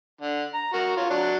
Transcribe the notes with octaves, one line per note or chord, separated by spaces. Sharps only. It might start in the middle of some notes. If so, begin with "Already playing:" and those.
D3
A#5
F#4 A#4
F4 C#5
F#3 D4